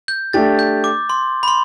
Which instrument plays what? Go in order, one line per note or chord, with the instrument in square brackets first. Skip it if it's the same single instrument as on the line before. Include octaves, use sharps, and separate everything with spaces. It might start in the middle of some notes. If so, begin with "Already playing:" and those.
[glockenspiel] G6
[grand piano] A3 D4 G4 [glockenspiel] A6
[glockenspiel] G6
D6
C6
B5
C6